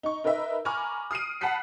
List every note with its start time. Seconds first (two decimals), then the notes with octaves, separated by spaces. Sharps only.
0.03 D#4 C#6
0.24 D#4 A#4 B4 D#5 E5
0.65 G#5 A#5 B5 C#6 D6 F6
1.11 D#6 F6 C7 D7 D#7
1.41 F#5 A5 B5 F#6 B6 C7